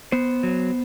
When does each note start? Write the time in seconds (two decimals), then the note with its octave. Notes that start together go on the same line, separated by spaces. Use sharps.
0.12 B3 C5
0.43 F#3